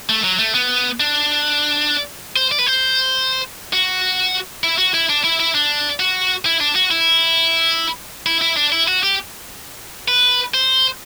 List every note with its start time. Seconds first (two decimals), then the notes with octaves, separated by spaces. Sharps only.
0.09 A3
0.24 F#3
0.39 A3
0.55 B3
1.00 D4
2.36 C5
2.52 D5
2.59 B4
2.66 C5
3.73 F#4
4.64 E4
4.78 F#4
4.94 E4
5.09 D4
5.24 E4
5.40 E4
5.55 D4
6.00 F#4
6.46 E4
6.60 D4
6.75 F#4
6.91 E4
8.26 E4
8.41 E4
8.57 D4
8.72 E4
8.88 F#4
9.03 G4
10.08 B4
10.54 C5